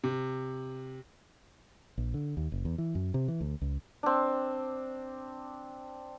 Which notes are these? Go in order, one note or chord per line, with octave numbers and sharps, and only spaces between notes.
C3
A#1
D3
D#2
F#1
E2
E3
F#2
C3
E3
D2
C#2
C4 D4